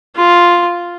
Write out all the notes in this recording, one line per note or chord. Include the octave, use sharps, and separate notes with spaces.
F4